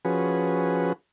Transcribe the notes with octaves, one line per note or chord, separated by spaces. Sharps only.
F3 C#4 F#4 G#4 B4